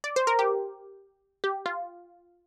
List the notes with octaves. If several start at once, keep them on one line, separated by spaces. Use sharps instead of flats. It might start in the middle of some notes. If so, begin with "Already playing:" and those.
D5
C5
A#4
G4
G4
F4